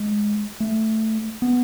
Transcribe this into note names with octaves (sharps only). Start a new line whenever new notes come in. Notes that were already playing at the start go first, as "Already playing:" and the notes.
Already playing: G#3
A3
B3